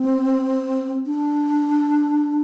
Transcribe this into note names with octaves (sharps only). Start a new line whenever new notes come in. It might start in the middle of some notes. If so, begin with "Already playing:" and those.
Already playing: C4
D4